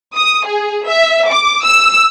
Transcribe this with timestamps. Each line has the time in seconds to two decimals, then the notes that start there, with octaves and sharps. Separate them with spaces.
0.16 D#6
0.47 G#4
0.87 E5
1.28 D6
1.65 E6